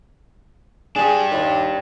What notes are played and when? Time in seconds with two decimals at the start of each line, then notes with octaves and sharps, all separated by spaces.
0.96 D4 G4 G#4
1.31 D#2